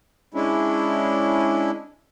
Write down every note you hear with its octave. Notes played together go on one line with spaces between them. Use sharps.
G#3 C#4 D4 E4